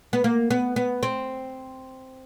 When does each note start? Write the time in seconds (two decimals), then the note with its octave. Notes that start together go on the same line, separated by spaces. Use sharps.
0.13 B3
0.24 A#3
0.51 B3
0.76 B3
1.03 C4